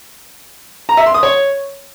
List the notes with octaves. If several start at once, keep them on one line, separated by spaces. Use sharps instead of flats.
A#5
E5
C6
D#6
C#5